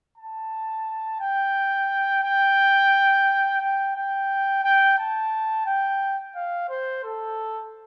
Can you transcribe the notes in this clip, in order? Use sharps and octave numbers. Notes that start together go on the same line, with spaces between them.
A5
G5
G5
G5
G5
G5
A5
G5
F5
C5
A4